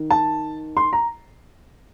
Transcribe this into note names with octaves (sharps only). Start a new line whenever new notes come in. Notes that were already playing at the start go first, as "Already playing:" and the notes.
Already playing: D#3
A5
C6
A#5